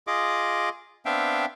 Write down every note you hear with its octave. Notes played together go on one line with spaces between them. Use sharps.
F4 G#4 D#5 D6
B3 C4 D4 E5 F5 G5